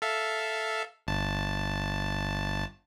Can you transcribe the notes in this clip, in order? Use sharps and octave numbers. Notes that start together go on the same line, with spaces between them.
A4 E5 F5
G1 A5